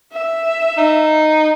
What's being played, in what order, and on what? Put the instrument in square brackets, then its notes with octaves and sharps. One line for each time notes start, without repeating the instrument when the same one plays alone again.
[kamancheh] E5
[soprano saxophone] D#4